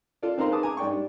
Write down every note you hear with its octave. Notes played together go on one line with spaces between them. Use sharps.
F4 A4 D5
C4 D#4 A#4 F5 A#5 C6
D#4 G#4 B4 A5 D6 D#6
G#5 A#5 D6
G#2 D5 G5 C#6
G3 D4 D#4